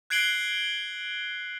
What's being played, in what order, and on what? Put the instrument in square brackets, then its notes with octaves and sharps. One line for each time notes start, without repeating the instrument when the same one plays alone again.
[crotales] F#6 G#6 C7 D7 F#7 G7